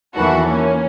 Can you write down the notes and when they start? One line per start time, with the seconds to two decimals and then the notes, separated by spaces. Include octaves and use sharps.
0.15 E2 D#3 E3 A#3 F#4 A4
0.46 A#3 C#4